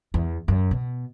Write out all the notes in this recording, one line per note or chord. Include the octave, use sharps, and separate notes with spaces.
E2
F#2
B2